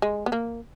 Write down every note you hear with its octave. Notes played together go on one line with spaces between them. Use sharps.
G#3
B3
A#3